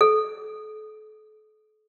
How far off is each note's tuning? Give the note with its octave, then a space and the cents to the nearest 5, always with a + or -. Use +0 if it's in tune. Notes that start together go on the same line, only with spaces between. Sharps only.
A4 -35